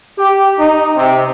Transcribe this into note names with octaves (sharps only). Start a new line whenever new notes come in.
G4
D#4
C3